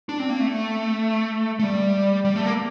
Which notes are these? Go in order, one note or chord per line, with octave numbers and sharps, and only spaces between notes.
D4
C4
A#3
A3
A3
G3
G3
A3
A#3